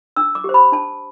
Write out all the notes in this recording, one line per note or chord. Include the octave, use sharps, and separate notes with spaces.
D4 E6
D6
G4 C5
B5
D4 A5